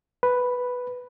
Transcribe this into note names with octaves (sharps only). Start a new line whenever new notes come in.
B4